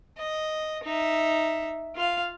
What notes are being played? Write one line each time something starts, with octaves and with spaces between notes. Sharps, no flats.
D#5
D#4 E5
F4 F5